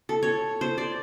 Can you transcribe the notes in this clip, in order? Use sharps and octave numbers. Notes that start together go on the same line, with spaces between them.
A4
C#5
C5
D5